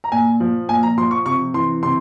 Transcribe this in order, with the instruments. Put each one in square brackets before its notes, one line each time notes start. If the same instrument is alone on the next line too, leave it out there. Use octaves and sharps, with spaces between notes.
[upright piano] A#5
A#2 G#5
F3
A#2 G#5
A#5
F3 C6
C#6
C3 C#6
E3 C6
C3 C6